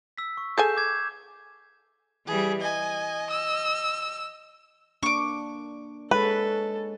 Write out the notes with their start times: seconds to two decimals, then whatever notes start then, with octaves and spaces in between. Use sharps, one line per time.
0.18 E6 B6
0.37 C#6
0.58 G#4 A4 G#5 G6 C7 E7
0.77 D6 G#6
2.27 E3 G3 G#4
2.62 D#5 G#5
3.30 E6
5.03 A#3 D4 C#6 D6
6.11 G#3 G#4 A4 B4 C#5